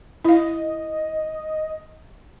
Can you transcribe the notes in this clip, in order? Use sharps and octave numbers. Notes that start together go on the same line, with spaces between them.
E4 D#5 F5